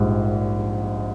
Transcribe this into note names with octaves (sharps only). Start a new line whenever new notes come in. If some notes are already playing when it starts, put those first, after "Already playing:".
Already playing: A#1 G#2 G3